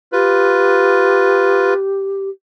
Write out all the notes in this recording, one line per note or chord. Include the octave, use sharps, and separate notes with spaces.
F4 G4 B4